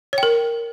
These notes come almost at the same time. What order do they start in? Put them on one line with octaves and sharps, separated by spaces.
C#5 G5 A#4